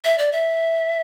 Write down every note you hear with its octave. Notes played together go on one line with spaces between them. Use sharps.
E5
D5
E5